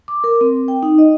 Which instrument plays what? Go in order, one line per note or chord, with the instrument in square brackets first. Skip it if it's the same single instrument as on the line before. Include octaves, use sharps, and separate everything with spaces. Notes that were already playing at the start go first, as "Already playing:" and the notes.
[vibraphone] D6
A#4
C4
G5
D#4
D#5